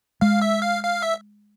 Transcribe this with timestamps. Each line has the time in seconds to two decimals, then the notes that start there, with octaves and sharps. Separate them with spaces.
0.21 G#3 F5
0.42 E5
0.62 F5
0.83 F5
1.02 E5